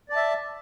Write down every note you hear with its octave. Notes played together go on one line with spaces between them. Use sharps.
D5 E5 A5